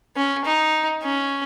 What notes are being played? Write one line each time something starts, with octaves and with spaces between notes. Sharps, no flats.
C#4
D#4
C#4